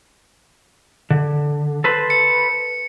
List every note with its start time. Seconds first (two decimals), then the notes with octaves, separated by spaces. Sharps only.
1.10 D3
1.84 A4 B4 C5
2.10 C#7